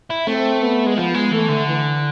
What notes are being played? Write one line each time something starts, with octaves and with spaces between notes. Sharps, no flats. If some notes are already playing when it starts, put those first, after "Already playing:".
E4
A3 C4
B3
G#3
F3 B3
G#3
E3 A3
D3
E3